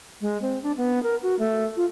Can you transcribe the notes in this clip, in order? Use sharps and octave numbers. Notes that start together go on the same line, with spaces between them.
G#3
C4
D4
B3
A#4
F#4
A3
F4